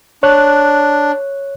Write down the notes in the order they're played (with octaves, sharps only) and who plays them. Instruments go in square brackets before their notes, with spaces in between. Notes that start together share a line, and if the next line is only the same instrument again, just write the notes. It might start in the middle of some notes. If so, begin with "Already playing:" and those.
[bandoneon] D4 [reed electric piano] C#5 F#6